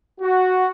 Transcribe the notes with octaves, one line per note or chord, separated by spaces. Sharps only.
F#4